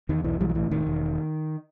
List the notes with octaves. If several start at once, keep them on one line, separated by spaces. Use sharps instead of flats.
E2 D#3
B1 E3
B1 E3 G3
F#3
A2 E3
E1 D#3
E1